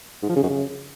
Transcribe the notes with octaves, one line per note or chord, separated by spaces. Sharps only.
G#2
F3
C#3
F#2
C#3